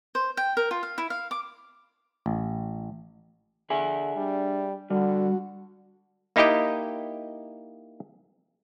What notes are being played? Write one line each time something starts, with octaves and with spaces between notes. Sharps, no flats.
C5
G5
A#4
F4
F5
E4
F5
D6
A1
D3 G#4 E5 G#5
G3 D4
D3 G3 F#4
A#3 D#4 E4 G4 D#5 G5